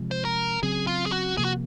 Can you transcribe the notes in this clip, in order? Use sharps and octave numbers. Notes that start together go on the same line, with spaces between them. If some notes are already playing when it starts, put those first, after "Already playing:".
Already playing: C3 F3 G#3
C5
A#4
C#3 F#3 C4 G#4
F4
G#4
F#4
C3 F3 A#3 G#4
F#4